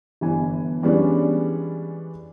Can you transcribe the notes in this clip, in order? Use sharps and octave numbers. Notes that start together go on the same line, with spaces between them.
G1 E3 G#5
E3 G3 G#3 B3 C#4 D4